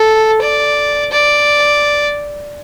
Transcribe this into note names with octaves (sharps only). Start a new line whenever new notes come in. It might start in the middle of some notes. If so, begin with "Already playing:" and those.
Already playing: A4
D5
D5